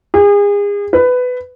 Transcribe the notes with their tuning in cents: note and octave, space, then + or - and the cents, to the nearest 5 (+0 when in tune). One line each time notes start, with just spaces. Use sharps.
G#4 -35
B4 +15